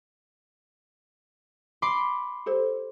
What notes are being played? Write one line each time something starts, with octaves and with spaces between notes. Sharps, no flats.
B5 C6 D6
G4 A4 C5